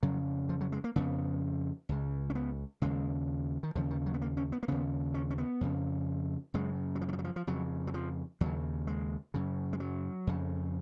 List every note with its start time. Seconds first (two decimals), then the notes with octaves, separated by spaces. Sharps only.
0.03 F2 C#3 F#3
0.49 F3
0.61 F#3
0.72 G#3
0.84 A#3
0.96 F2 C#3 B3
1.89 C#2 C#3
2.30 C#4
2.35 B3
2.82 D#2 C#3 G#3
3.63 D#3
3.75 D#2 C#3 F3
3.91 D#3
4.06 F#3
4.14 B3
4.22 A#3
4.37 C#4
4.52 B3
4.63 A#3
4.68 D#2 C#3 B3
5.14 C#4
5.30 C#4
5.38 B3
5.61 F2 C#3
6.54 F#2 C#3 G#3
6.95 F#3
7.01 F3
7.08 D#3
7.13 F3
7.19 F#3
7.24 F3
7.36 F3
7.47 F2 C#3 F#3
7.87 F#3
7.94 F3
8.41 D#2 C#3 F#3
8.87 G#3
9.34 F#2 C#3
9.73 G#3
9.80 F#3
10.27 F2 C#3